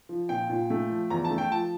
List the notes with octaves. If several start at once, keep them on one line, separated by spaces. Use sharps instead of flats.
F3
A#2 G5
A#2
A3
F3
E2 A#5
A5
A3
G5
F3 A5